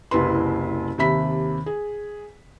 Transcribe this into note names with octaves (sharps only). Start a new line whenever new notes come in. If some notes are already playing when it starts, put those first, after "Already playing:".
F#1 C2 E4 B4 C6
D#2 C3 E5 B5 B6
G#4